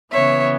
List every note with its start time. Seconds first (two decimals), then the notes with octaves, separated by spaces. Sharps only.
0.12 C#3 E3 B3 C#5 E5